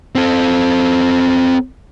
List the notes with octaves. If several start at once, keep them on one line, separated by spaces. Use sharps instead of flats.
C4 A4